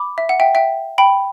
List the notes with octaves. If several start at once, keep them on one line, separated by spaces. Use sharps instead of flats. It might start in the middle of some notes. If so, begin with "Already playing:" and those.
Already playing: B5 D6
E5
F#5
E5 G5
E5 G5
G5 B5